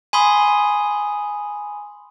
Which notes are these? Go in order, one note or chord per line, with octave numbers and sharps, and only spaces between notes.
G#5 B5 C6 D#6